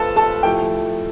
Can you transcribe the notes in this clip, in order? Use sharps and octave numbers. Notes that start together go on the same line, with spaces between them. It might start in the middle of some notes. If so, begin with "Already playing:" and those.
Already playing: C3 F3 A3 F4 A4 B4 A5
A4 A5
F3 A3 E4 G4 G5